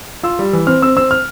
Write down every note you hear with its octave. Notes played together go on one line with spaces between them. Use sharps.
F4 E6
G3
E3
C4 F6
C4 E6
C4 E6
F6